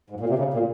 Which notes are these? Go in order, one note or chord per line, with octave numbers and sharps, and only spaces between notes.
G#2
A#2
C3
C#3
A#2